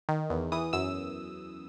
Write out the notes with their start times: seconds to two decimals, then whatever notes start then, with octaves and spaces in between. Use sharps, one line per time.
0.09 D#3
0.30 E2
0.52 E3 D#6
0.73 F#2 E6